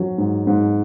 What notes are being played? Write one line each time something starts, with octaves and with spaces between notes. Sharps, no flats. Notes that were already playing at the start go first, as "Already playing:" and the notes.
Already playing: F#3 C#4
G#2
G#2